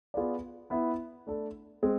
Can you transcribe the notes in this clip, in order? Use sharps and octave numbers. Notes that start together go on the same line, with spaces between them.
B3 F4 G#4 B4 D5
B3 E4 B4 E5
A3 D4 A4
G#3 C4 G#4